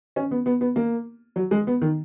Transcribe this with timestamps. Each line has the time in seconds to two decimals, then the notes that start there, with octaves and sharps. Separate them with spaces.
0.16 C#4
0.31 B3
0.46 B3
0.61 B3
0.76 A#3
1.36 F#3
1.51 G#3
1.67 B3
1.82 D#3